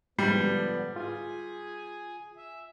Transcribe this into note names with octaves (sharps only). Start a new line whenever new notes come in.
G#2 D3 F3 G3 B3
F4 G#4 G#5
E5